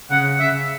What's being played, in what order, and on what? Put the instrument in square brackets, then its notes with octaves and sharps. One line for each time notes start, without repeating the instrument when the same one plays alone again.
[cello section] C#3 [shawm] F#5
[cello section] C#3 [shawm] E5